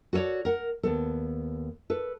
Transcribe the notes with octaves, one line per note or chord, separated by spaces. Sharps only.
F#4 A4 A#4 C#5 D5
A#4 F#5
D#2 B3 A4
A4 B4